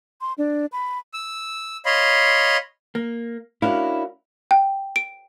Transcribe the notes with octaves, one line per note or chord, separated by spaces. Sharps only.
C6
D4
B5
E6
C#5 D#5 F5 B5 C6
A#3
C#4 D4 E4 F#4 A#4 F5
G5
D7